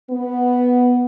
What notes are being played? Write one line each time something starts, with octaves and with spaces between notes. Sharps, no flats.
B3